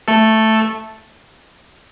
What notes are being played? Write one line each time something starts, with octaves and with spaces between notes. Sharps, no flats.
A3 A4